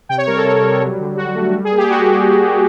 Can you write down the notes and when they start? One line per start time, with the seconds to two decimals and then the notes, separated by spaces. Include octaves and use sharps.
0.09 C3 G5
0.18 C#5
0.27 G3 A#4
0.37 A4
0.44 C3
0.62 G3
0.81 F#3
0.99 D3
1.17 D3 F#4
1.35 A3
1.54 G3
1.64 G#4
1.71 A#3
1.77 G4
1.90 G3 F#4